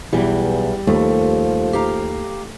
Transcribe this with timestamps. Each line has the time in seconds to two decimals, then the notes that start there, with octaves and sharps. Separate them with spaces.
0.13 B1 E2 B2 E3 G3
0.87 D#2 F3 A3
1.73 G4 F5 A#5